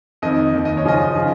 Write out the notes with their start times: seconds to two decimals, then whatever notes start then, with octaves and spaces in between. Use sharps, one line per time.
0.22 F2 D#3 D#5
0.54 D#2 D#3
0.65 D#5
0.77 C#5
0.84 F#2 C#3 F3 D#5
1.15 C#3 F3